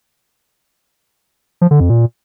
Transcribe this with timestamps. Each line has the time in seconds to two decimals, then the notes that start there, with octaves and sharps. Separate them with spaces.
1.61 F3
1.71 D3
1.80 F2
1.89 A#2